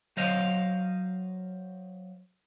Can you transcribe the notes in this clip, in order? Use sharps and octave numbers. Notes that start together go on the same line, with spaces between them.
F#3 C5 D#5 F5